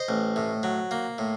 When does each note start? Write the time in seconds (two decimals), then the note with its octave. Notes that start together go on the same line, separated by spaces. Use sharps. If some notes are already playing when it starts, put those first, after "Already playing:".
Already playing: C5 D#5
0.09 A1
0.36 A2
0.63 F#3
0.91 A#3
1.18 A2